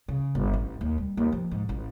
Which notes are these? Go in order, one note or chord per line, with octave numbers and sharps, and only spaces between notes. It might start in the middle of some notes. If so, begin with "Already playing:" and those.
C#3
G1
A1
D#2
G3
D#2
F3
G#2
A1